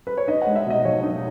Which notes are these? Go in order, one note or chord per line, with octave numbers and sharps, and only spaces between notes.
B4
C#5
D#4 D#5
G#3 F#5
E5
B2 D#5
B1 C#5
D#4